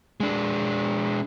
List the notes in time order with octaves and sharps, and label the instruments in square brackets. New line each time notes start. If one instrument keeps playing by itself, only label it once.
[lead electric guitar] G#3 D4